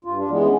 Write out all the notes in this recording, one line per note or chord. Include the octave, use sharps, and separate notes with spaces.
G2 F4
D4
E3 G#3 B3
C#4